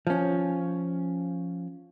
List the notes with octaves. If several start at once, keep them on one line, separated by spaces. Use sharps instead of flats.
F3 C#4